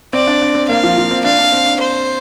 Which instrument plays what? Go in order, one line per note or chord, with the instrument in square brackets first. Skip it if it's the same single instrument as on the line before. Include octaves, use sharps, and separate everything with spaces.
[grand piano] C4 [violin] D5
[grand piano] D4
D4
C4
[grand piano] A#3 [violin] F5
[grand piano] F3
F3
C4
[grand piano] D4 [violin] F5
[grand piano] D4
C4
D4
[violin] C5